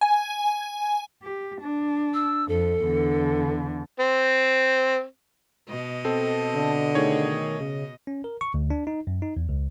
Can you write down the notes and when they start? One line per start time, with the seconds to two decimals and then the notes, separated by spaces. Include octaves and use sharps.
0.01 G#5
1.23 G4
1.61 D4
2.14 E6
2.49 F2 A4
2.86 E2 D3
4.00 C4
5.68 B2 D#5
6.05 C4 A4
6.55 D3
6.95 D#3 A3 G#4 C#5
7.60 C#3
8.07 C#4
8.24 A#4
8.41 C#6
8.54 D2
8.70 D4
8.87 D#4
9.07 F#2
9.22 D#4
9.37 E2
9.49 C#2